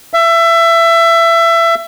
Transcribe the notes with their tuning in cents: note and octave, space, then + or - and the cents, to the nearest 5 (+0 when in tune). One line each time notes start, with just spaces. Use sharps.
E5 +25